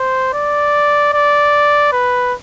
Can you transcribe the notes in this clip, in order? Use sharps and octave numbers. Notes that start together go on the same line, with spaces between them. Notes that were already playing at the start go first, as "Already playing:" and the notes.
Already playing: C5
D5
D5
B4